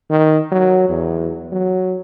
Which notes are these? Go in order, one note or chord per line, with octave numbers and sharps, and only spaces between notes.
D#3
F#3
E2
F#3